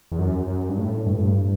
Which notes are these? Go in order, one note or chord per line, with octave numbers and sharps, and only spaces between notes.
E2
F#2
F#2
G2
A2
G2
A2
G2